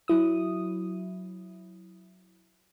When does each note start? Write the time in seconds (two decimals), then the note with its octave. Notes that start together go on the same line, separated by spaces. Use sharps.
0.08 F#3 E4 D#6